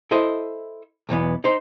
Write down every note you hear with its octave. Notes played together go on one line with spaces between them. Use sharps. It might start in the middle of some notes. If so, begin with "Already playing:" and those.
E4 A4 C5 D#5 E5
B1 E2 E3 B3
D#4 C5